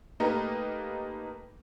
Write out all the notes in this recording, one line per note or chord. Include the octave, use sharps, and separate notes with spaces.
A3 A#3 D#4 G4 A#4 B4